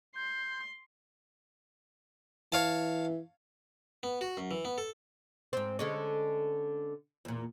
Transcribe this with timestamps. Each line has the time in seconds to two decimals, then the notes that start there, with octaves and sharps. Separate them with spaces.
0.16 C6 G6
2.52 E3 C#5 F5 A5
4.03 B3
4.21 F#4
4.37 F#2
4.51 E3
4.65 B3
4.78 A4
5.53 G#2 C4
5.79 D3 G#3 C#4
7.25 E2 A#2